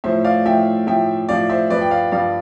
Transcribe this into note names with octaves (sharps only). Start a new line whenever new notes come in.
A2 F3 C5 E5
D5 F5
A2 F3 E5 G5
A2 F3 E5 G5
A2 F3 D5 F5
C5 E5
G2 F3 B4 D5
G5
D5 F5
G2 F3 D5 F5